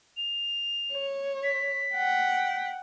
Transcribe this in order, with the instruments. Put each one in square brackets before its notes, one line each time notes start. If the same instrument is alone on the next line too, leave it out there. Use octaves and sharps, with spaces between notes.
[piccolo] F7
[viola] C#5
[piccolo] B6
[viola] F#5 G5